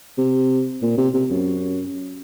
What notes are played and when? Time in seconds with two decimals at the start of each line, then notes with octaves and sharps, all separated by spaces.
0.18 C3
0.82 A#2
0.98 C3
1.14 C3
1.31 F#2